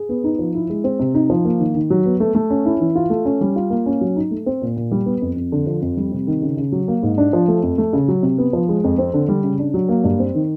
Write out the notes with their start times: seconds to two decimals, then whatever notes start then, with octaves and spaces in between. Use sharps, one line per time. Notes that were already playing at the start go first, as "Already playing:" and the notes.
Already playing: G#4
0.09 B3
0.24 D#4
0.39 F3
0.54 E4
0.70 G#3
0.84 C4
0.99 C3
1.14 D#4
1.30 F3
1.45 A#3
1.59 D#3
1.75 D#3
1.90 F#3
2.05 B3
2.20 A3
2.35 A3
2.50 C#4
2.66 E4
2.80 E3
2.95 F4
3.10 A3
3.25 C#4
3.41 G3
3.56 F4
3.70 A#3
3.86 C#4
4.01 F#3
4.16 D#4
4.31 A3
4.46 C4
4.62 A#2
4.76 A#2
4.91 G3
5.06 B3
5.22 F2
5.36 F2
5.52 D3
5.67 F3
5.82 F2
5.97 G3
6.12 C3
6.27 D#3
6.42 C#3
6.57 C#3
6.72 F#3
6.88 A#3
7.03 G#2
7.18 D4
7.33 F3
7.48 A3
7.63 F2
7.78 A3
7.93 C#3
8.08 F#3
8.23 C3
8.38 B3
8.53 F3
8.69 G#3
8.84 F2
8.98 C4
9.14 D3
9.28 G3
9.44 C#3
9.59 D4
9.74 F#3
9.89 A#3
10.04 G2
10.19 C4
10.35 D#3